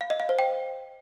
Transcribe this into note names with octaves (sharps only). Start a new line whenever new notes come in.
F5
D#5
F5
C5
G5